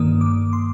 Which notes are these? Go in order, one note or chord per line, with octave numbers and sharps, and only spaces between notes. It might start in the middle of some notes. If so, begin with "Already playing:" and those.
Already playing: G2 D#3 A#3 D#6
D6
C6